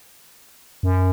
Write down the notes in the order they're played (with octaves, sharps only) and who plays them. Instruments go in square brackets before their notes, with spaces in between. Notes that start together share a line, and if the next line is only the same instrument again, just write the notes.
[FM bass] F#2